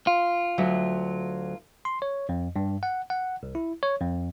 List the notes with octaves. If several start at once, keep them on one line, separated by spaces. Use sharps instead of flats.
F4
D2 F#3 E5
C6
C#5
F2
G2
F#5
F#5
C2
E4
C#5
F2